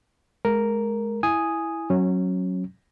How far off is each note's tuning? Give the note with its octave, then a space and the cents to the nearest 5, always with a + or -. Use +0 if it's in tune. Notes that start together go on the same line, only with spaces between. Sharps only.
G#3 +20 A#4 +0
E4 +0 G#5 +0 D#6 +0
F#3 +0 C#4 -20